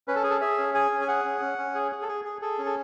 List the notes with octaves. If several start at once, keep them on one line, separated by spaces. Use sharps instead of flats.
C#4 B4
A4
G#4
A4
G#4 E5
C#4
G#4 G#5
C#4
G#5
G#4 F#5
C#4
C#4
C#4
G#4
G#4
A4
G#4
G#4
G#4 A4
C#4
A4